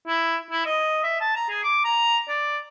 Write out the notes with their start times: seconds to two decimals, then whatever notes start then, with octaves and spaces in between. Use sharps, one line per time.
0.08 E4
0.51 E4
0.66 D#5
1.04 E5
1.20 A5
1.36 A#5
1.49 G#4
1.64 D6
1.85 A#5
2.28 D5